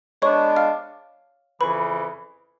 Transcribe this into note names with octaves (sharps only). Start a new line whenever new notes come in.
G#3 B3 D4 C#5 C#6
F5 F6
F2 C#3 E3 B4 B5